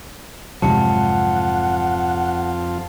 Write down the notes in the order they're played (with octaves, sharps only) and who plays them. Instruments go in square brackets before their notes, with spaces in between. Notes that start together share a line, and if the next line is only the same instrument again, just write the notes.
[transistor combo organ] F2 F4 [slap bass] G#2 C3 F#3 [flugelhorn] F#5 [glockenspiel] A5 C#7